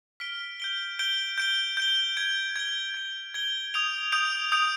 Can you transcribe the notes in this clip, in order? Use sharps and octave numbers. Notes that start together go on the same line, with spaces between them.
F6 B6 D7 G7
G6 D7 G7
G6 D7 G7
G6 D7 G7
G6 D7 G7
G#6 D7 G7
G#6 D7 G7
G#6 D7 G7
G#6 D7 G7
D#6 G6 D7 F7
D#6 G6 D7 F7
D#6 G6 D7 F7